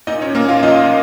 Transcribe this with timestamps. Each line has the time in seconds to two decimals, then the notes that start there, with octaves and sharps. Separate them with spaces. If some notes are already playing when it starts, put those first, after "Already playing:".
0.07 A#2 D#4 D#5
0.21 C#4 C#5
0.35 A#2 A#3 A#4
0.49 F4 F5
0.63 F3 D#4 D#5